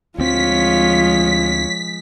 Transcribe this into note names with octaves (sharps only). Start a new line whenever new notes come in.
D2 F3 G#3 C4 F4 C#5 B6